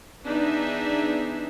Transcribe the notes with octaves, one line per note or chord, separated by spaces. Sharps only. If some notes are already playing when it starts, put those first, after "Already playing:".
E3 B3 D4 D#4 G#4 E5